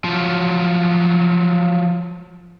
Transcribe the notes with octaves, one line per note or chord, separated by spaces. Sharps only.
F3 F#3